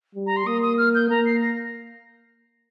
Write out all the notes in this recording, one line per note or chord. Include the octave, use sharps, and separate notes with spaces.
G3
A#5
C6
A#3 D#6
D#6
F6
G6
A#3 A#5
C7
A#6